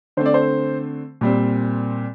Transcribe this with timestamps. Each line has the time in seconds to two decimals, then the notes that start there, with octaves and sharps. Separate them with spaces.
0.17 D3 A3 C4 C5
0.26 D5
0.34 C5
1.21 A#2 G3 C4